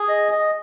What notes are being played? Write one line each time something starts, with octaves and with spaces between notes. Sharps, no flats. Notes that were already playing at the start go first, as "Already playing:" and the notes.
Already playing: G#4
D#5
D#5